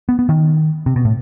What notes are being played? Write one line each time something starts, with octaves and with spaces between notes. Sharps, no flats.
B3
B3
D#3
C3
B2
A2